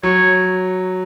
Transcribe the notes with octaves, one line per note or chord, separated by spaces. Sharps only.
F#3 C#5